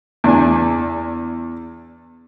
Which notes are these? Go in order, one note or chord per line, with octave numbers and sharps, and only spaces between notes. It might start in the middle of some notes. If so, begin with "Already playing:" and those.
E2 D4 G#5